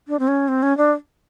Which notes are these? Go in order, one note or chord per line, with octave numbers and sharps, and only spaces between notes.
D4
C4
C#4
C4
C#4
D4